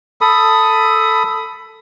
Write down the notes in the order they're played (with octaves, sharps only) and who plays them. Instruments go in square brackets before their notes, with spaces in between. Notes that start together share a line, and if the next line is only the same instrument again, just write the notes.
[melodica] A4 B5 D#6